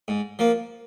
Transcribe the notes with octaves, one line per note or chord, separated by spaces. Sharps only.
G#2
F3 A#3